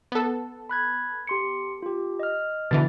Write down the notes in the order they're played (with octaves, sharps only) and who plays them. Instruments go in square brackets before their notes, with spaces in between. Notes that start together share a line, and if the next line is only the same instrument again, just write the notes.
[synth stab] B3 A4
[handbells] B5 F#6 G#6
G4 C6 C#7
F4 G4
D#5 F6
[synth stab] B2 D3 E3 [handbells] A6